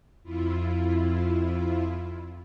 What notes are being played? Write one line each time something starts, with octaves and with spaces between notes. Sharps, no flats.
F2 E4 F4